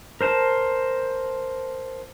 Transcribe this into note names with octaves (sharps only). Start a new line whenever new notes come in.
A#4 C5 A5